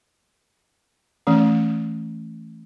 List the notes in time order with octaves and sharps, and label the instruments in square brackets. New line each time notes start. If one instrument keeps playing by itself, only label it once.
[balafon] E3 A3 C#4